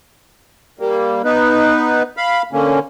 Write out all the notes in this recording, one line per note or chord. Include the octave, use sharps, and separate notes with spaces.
G3 A#3
B3 D#4 B4
F5 B5
D3 A#3 C#4